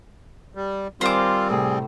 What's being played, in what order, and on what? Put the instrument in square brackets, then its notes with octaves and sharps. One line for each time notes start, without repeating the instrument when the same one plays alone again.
[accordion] G3
[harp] D#3 A#4 G#5 [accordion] G3 C4 [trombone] F4 [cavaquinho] C5 D6
[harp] A2 C3 [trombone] G#4